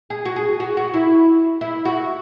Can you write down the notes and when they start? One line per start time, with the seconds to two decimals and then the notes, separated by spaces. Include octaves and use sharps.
0.10 G#4
0.25 F#4
0.36 G#4
0.60 F#4
0.77 F#4
0.94 E4
1.61 E4
1.85 F#4